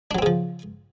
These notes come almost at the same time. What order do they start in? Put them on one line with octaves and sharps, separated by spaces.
D4 F#3 C4 C#3 F3